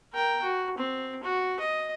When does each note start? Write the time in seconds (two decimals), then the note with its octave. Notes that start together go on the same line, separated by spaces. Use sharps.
0.13 A#4 G5
0.42 F#4
0.78 C4
1.24 F#4
1.60 D#5